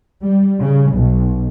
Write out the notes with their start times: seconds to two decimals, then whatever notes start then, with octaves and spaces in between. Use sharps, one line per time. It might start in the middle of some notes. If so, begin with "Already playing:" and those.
0.23 G3
0.62 C#3
0.96 B1